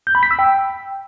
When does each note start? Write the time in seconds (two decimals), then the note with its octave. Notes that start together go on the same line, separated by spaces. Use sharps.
0.07 G6
0.15 B5
0.23 B6
0.31 E6
0.39 G5